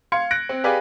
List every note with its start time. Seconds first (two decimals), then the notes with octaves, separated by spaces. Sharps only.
0.12 F5 C6 G#6 C#7
0.31 F#6 A#6 D7
0.49 C4
0.64 G4 G#4 B4 D5 F5 G#5